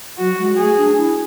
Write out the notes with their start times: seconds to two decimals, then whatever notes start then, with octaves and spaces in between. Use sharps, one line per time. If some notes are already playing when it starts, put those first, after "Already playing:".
0.18 F#3 F#4
0.39 G#3
0.58 A3 G#4
0.77 D4
0.98 E4